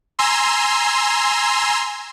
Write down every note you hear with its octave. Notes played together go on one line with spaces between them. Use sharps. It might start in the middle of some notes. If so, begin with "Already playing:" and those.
G#5 A#5 C6 E6